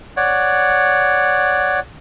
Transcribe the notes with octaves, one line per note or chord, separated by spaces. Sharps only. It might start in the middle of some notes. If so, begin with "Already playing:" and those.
C#5 D5 F#5